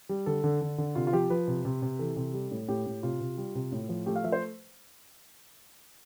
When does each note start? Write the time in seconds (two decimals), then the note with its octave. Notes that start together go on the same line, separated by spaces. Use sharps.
0.09 G3
0.26 D3 A4
0.44 D3
0.61 D3
0.78 D3
0.95 C3 F4
1.07 F4
1.13 F3 G4
1.30 F3 B4
1.47 C3
1.65 C3
1.82 C3
1.99 E3 A4
2.16 C3
2.34 G3
2.51 A2
2.68 A2 G4
2.86 A2
3.03 C3 F4
3.21 C3
3.38 G3
3.55 C3
3.72 A2
3.89 F3
4.06 A3 G4
4.16 F5
4.24 F3 E5
4.32 C5